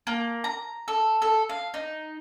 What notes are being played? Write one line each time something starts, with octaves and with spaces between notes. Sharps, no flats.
A#3
A#5
A4
A4
F5
D#4